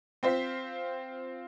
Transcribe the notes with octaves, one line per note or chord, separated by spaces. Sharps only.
C4 F4 C5 B6